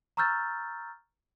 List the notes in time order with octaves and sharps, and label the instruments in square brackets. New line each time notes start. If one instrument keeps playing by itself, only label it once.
[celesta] A#5 C#6 E6 F6 G6 A6